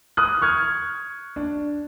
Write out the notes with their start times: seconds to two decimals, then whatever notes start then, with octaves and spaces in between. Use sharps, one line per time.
0.17 D#6 F#6
0.42 C#6 F6 G#6
1.36 D4